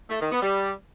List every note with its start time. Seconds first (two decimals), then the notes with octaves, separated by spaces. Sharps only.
0.10 A3
0.20 D#3
0.31 B3
0.41 G3